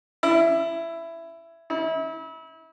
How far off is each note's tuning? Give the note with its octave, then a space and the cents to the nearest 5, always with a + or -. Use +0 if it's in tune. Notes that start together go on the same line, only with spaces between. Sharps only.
E4 +15
E4 -35